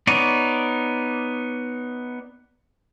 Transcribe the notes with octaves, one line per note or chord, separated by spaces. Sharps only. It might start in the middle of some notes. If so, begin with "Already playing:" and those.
B3 D#4 C#5 D5